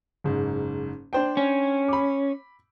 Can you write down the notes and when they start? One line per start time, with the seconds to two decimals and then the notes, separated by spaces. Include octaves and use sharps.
0.24 F#1 G#2
1.13 D4 C5 G5
1.37 C#4
1.88 B5 D6